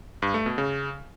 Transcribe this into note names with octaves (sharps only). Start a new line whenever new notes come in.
G2
A3
B2
C#3